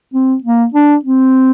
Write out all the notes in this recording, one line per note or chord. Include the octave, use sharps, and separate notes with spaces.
C4
A#3
D4
C4